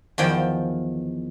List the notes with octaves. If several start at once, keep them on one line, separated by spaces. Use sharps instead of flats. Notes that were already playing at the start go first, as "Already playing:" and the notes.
E2 D#3 F3 G5